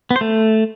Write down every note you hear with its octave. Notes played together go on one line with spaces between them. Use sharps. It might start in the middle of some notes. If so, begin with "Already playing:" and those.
B3
C5
A3